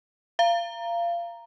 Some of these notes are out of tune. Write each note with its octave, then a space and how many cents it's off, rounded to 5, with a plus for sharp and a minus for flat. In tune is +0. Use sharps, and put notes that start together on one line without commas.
F5 -25 A#5 +0